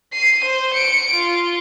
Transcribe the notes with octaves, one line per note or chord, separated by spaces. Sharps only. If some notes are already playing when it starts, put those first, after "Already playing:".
C7 D#7
C5
C#7 D7
F4